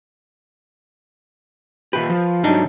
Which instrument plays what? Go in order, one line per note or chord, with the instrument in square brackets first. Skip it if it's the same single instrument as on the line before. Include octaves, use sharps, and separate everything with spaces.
[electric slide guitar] A#2 G4 [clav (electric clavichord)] B4
[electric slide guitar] F3
[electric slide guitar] G#2 F#3 [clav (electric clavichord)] G3 D4 D#4